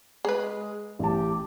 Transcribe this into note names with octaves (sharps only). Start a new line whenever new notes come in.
G#3 G#4 B4
A1 G4 A5